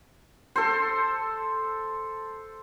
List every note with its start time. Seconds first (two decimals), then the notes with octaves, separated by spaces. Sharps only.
0.56 A4 C5